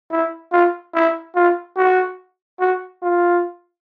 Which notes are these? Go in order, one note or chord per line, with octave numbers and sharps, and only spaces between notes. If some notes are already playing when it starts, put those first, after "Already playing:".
E4
F4
E4
F4
F#4
F#4
F4